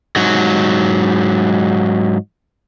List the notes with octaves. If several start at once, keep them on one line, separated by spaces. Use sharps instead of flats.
G#2 F#3